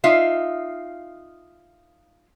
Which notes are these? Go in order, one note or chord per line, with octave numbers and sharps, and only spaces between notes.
D#4 F4 E5 F5